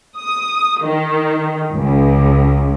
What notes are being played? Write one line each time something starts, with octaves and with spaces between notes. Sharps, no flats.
D#6
D#3
C#2